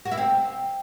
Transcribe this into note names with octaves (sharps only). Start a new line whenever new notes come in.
F#4
E4
C4